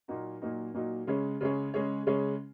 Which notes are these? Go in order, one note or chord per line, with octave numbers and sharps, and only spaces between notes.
A#2 F#3 A#3 D#4 F#4
A#2 F#3 A#3 D#4 F#4
A#2 F#3 A#3 D#4 F#4
C#3 G#3 C#4 G#4 C#5
C#3 G#3 C#4 G#4 C#5
C#3 G#3 C#4 G#4 C#5
C#3 G#3 C#4 G#4 C#5